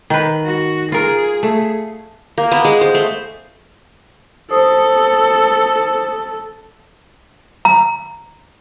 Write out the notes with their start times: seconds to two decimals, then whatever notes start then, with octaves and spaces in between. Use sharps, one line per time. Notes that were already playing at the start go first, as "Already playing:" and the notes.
0.10 D#3 B4
0.44 F#4
0.92 F4 G#4 A#4
1.43 A3
2.38 A#3
2.52 B3
2.65 G#3
2.81 C5
2.95 A3
4.51 A4 C5 D#6
7.65 A#5